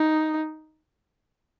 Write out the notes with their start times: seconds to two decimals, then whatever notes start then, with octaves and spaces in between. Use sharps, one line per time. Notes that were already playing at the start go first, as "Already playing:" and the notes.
Already playing: D#4